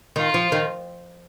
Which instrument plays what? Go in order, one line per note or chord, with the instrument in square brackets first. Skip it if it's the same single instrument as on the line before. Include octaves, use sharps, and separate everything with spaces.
[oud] D#3 [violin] F4
[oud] F3
D#3